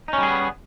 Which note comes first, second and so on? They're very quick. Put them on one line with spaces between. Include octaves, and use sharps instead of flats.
D#4 C#4 G3 G#4 B3